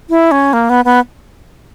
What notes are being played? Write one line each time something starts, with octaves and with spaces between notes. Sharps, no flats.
E4
C#4
A#3
B3
B3